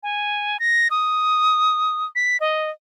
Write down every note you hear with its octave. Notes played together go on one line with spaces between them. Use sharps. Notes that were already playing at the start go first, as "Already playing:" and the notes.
G#5
A#6
D#6
B6
D#5